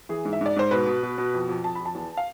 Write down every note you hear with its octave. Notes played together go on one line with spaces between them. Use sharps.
E3 G#4
G#2
E5
G#2 D5
G#2 C5
B2 B4
B2
B2
B2
F2
F2
F2 A5
B5
F2 A5
E2
F5